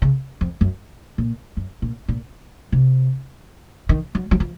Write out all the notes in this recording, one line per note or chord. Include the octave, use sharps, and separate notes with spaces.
C#3
F2
F#2
A#2
F#2
A#2
A#2
C3
D#3
F#3
F#3
F3